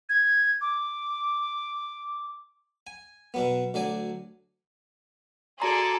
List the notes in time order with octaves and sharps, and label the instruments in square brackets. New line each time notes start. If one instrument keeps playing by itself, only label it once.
[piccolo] G#6
D6
[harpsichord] G#5
B2 F#3 B3
D2 F#3 D5 G#5
[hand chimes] F#4 A#5 C6 [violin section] G#4 A4 D5